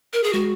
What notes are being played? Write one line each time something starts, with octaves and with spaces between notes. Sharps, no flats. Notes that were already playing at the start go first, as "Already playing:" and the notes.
A#4
G#4
G#3 F#4